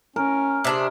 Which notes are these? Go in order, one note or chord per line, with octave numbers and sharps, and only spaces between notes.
C#4 A#4
C3 D4 G#4